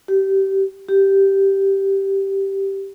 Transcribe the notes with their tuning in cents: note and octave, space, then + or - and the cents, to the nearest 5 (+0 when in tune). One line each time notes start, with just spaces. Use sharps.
G4 -20
G4 -5